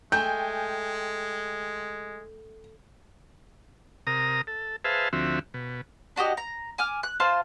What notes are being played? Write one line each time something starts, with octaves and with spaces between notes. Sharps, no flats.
G#3 A3 G5 G#5 G6
C3 A#4 A#5 D#6
A4
G#4 B4 C5 E5 F5 A5
D2 F3 C4 F#4 E5
B2
D4 F#4 G4 D#5
A#5
G#5 D6 F6
F#6
F4 C5 A5